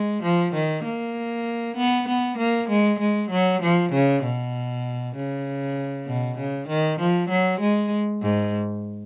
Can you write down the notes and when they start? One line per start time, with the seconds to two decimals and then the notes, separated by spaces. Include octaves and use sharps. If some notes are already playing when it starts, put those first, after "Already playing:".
Already playing: G#3
0.23 F3
0.53 D#3
0.84 A#3
1.77 B3
2.08 B3
2.38 A#3
2.69 G#3
2.99 G#3
3.30 F#3
3.62 F3
3.92 C#3
4.23 B2
5.15 C#3
6.07 B2
6.38 C#3
6.68 D#3
7.00 F3
7.29 F#3
7.60 G#3
8.22 G#2